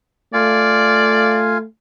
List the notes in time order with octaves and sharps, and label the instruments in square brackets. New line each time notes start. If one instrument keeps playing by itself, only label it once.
[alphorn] A3 [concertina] F4 F5 G#5 [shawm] D5